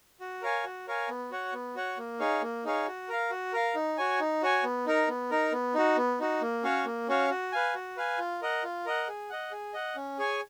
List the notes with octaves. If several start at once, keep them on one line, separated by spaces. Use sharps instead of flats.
F#4
A#4 C#5 F5 G#5
F#4
A#4 C#5 F5 G#5
B3
F#4 C#5 F#5
B3
F#4 C#5 F#5
A#3
D#4 G#4 C#5 F5
A#3
D#4 G#4 C#5 F5
F#4
A#4 F5
F#4
A#4 F5
D#4
F#4 C#5 G#5
D#4
F#4 C#5 G#5
B3
D#4 A#4
B3
D#4 A#4
B3
D#4 F#4
B3
D#4 F#4
A#3
C#4 F#4 C#5 F5
A#3
C#4 F#4 C#5 F5
F#4
B4 F5 G#5
F#4
B4 F5 G#5
F4
A#4 D#5 F#5
F4
A#4 D#5 F#5
G#4
D#5 F#5
G#4
D#5 F#5
C#4
G#4 C#5 G#5